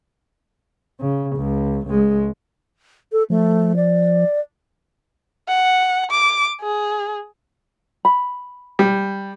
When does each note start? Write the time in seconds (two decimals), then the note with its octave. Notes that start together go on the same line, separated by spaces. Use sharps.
1.01 C#3
1.36 C#2
1.87 C#2 G#3
3.12 A4
3.30 F3 A3
3.76 D5
5.48 F#5
6.11 D6
6.61 G#4
8.05 B5
8.79 G3